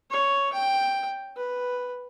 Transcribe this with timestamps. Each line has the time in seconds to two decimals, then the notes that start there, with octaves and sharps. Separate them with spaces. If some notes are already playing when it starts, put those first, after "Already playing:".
0.11 C#5
0.53 G5
1.37 B4